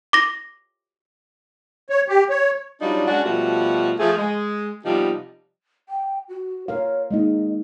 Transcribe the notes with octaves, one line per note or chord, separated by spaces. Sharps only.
D6 A#6
C#5
G4
C#5
F#3 G3 D4 D#4 F4 F#4
G#3 C#4 D4 F#4
B2 F3 G3 A3 F#4
F3 A3 G#4
G#3
C3 F3 G3 B3 D#4 G4
G5
F#4
A#4 C#5 F5
G#3 A#3 D#4 D#5